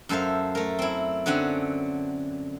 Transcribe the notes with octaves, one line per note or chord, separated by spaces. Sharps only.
F#2 A4 C5 E5 F5
A3 A#4
C4 E4
D3 F#3 C4 C#4 F#5